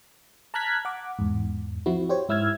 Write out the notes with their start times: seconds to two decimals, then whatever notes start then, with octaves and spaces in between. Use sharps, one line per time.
0.54 A5 A#5 F6 F#6 G#6 B6
0.85 F#5 D6
1.18 E2 G#2
1.86 F3 C4 E4 F#4
2.09 G4 C5 C#5
2.29 G#2 E4 E6 F6 G#6